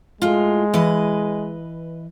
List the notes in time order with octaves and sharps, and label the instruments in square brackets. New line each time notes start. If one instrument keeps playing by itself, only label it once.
[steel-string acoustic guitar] A2 F4 [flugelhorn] G#3
[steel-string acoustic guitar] E3 B4 D#5